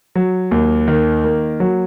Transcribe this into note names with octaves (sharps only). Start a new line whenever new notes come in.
F#3
D#2
D#3
A#3
F#3